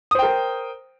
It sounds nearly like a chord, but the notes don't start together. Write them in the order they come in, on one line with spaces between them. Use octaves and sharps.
D#6 C5 G5 A#4